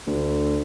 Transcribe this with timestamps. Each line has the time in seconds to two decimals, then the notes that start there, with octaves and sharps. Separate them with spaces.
0.07 D2